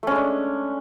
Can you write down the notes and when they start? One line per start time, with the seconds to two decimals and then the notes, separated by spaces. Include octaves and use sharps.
0.03 A3
0.07 C#4
0.11 G#3
0.16 D4